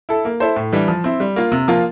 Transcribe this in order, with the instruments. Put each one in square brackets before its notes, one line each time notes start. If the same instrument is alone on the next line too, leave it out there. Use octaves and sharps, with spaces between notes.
[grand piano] E4 A4
A#3
E4 A4 C5
A2
E3 G3 D4
F3
C4 E4
G3
A#3 F4
C3
F3 A#3 F4